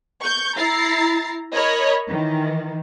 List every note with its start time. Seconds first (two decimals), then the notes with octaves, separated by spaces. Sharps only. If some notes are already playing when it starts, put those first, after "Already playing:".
0.21 C#6 G6
0.56 E4 A#5 A6 C7
1.53 A#4 C#5 D#5 B5
2.08 D#3 E3